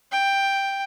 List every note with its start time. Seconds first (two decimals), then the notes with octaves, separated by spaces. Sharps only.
0.12 G5